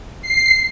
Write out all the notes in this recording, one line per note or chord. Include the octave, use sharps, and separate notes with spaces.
C7